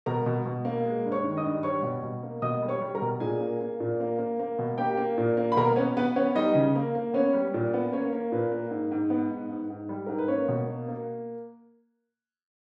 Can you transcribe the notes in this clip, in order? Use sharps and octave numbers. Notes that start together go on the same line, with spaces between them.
B2 A#4 A#5
B2
B2
A#3
G#3
G2
C#5 C#6
D#3
D#5 D#6
G2
G3 C#5 C#6
B2
B2
A#3
B2 D#5 D#6
G3
C#5 C#6
G3
A#4 A#5
B2
A#2 G#4 G#5
A#3
A#3
A#2
A#3
A#3
A#3
B2
A#3 G4 G5
A#3
A#2
A#3
B5
B2 A#4 A#5
B3 C#4 C#5
B3 B4
B3 C#4 C#5
G3 D#4 D#5
C#3
A#3
A#3
B3 C#4 C#5
G3
A#2
B3
A#3 C#4 C#5
A#3
A#2 B4
A#3
G#2
G#2
B3
G#2
G#2
G#2
G3
G#2 A#4
B4
A#3 C#4 C#5
B2
A#3
A#3